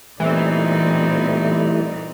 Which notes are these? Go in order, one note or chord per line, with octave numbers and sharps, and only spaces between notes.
A#2 E3 G3 A3 B3 C4 D#4 D5